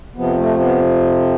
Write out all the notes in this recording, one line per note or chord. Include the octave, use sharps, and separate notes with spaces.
F2 C3 F3 B3
A3
B3